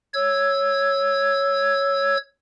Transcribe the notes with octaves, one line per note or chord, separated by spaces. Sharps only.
C#5 E6 G#6